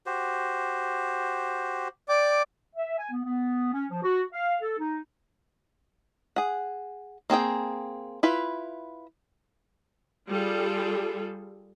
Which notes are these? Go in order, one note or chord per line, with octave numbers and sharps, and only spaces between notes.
F#4 G4 C5
D5 G5 D6
E5
G#5
B3
B3
C#4
F3
F#4
F5
A4
D#4
G#4 F#5
A#3 C4 G#4 G5
E4 F4 B4
G3 F4 G#4 A4